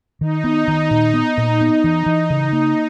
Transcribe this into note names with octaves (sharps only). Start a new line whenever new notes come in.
D#3 D#4
B3
D#3
A#2
B3
A#2
B3 D#4
E3
E3
C#3
A#3